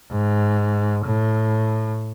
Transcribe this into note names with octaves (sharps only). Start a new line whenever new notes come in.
G#2
A2